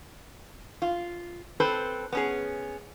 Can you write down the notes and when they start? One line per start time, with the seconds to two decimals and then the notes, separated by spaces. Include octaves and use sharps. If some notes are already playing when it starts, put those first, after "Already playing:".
0.82 F4
1.60 C4 A4 B4 C5
2.12 B3 C#4 G#4